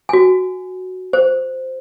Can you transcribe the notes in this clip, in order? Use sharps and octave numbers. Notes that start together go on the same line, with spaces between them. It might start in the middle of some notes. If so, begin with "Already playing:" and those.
F#4 G#5
C5